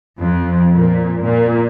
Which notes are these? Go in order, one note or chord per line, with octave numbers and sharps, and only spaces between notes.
F2
A#2
A#2